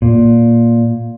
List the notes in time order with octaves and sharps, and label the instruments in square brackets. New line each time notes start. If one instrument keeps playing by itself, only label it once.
[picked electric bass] A#2